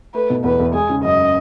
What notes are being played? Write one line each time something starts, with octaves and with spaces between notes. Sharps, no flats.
A3 B4
B2
E2 B4
E2
G#3 G#4
C#3
F#2 D#5